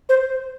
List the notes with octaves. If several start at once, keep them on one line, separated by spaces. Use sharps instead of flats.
C5